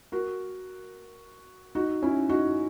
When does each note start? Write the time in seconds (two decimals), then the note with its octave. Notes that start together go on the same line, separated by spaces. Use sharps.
0.12 F#4 A#4
1.75 D#4 F#4
2.02 C#4 E4
2.29 D#4 F#4